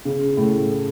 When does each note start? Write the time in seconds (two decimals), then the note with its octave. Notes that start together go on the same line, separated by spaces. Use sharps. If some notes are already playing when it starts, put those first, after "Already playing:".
0.05 C#3
0.37 A2